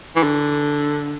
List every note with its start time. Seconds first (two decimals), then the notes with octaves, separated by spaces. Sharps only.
0.16 E3
0.23 D3